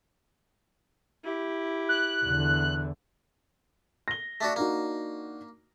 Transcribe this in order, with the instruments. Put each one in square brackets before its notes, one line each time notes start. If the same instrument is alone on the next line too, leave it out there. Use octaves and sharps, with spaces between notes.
[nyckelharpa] E4 G4
[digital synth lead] F#6
[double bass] E2 D3
[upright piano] A#6 G7
[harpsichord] A3 D4 F#4
[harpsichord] A#3 [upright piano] D4 D#4 F#4